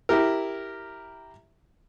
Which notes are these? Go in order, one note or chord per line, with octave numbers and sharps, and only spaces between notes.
E4 G4 A#4